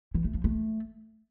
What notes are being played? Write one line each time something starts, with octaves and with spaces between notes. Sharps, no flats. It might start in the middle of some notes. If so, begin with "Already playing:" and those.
E3
A3
F3
A3